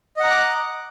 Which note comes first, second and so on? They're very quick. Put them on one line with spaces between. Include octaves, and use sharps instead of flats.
D#5 F#5 A#5 F#6 D6